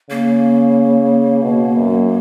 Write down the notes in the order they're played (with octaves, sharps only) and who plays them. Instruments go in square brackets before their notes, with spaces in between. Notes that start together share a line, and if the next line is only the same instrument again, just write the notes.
[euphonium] C#3 [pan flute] A#3
[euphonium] B2
F#2